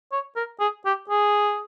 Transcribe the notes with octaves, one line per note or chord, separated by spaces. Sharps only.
C#5
A#4
G#4
G4
G#4